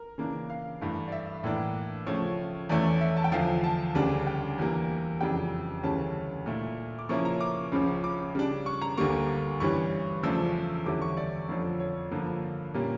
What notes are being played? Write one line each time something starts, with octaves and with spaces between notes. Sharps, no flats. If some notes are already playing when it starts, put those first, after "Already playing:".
Already playing: A#4
C#3 E3 A#3 D4
F5
G2 E3 A3
D5
E5
A2 E3 A#3 D4
C#3 F3 A3 C#5
E2 E3 A3 C#4 E4 D5
E5
A5
G5
E2 D3 F3 F5
A5
D2 C#3 G3 D4
G5
E2 E3 G3 A#3
F2 C#3 E3 G3 D4 G5
D2 C#3 E3 G3 C#4 A5
A#2 A3 E4
D6
C#3 F3 A#3 C#4 E4 C#6
A#5
D6
C#2 C#3 F3 C#4
D6
C#3 G3 D4
C#6
A#5
D2 D3 G3 A#3 C#6
G2 E3 G3 C#4 C#6
E2 C#3 F3 A3 D4 E6
E2 D3 G3 C#4 E4 D6
C#6
D5
F2 D3 F3 C#4
C#5
G2 D3 F3 A#3
A#2 G3 A#3 C#4